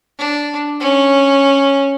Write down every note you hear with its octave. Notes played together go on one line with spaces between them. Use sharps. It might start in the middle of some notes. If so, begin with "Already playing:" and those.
D4
C#4